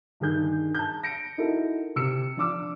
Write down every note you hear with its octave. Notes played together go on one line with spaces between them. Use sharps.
G2 D#3 G#4 G6
A5 G6
A#6 C#7 D7
D#4 E4 F#4 A4 A#4
C3 E6 C#7
F3 D4 D6 E6